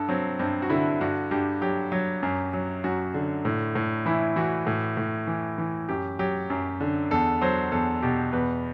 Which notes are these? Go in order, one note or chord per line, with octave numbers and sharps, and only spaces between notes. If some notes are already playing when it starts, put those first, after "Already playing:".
Already playing: G2 A4
F#3 C4
G2 C4
F#4
D3 E4
G2 F#4
G2 G4
F#3 G4
F#3
F#2
F#3
F#2 F#4
D3
A2
A2
E3 E4
E3 F#4
A2
A2
E3
E3
F#2 G4
F#3 G4
F#2
D3
E2 A4
F#3 C5
E2 A4
B2 G4
E2 B4